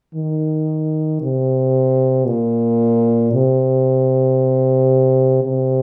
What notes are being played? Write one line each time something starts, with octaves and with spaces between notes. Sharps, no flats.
D#3
C3
A#2
C3
C3